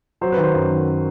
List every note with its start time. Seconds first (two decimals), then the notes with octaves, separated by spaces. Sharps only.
0.21 F#3 C5
0.32 B4
0.37 D#3
0.43 C5
0.54 F#2
0.71 D#3